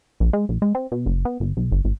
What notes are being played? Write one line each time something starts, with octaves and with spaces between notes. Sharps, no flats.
A#1
G#3
A#1
G#3
C4
B2
F#1
B3
G1
B1
G1
G#1